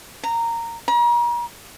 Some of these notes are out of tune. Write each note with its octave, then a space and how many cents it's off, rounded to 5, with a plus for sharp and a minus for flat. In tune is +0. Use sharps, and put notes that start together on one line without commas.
A#5 -10
A#5 +40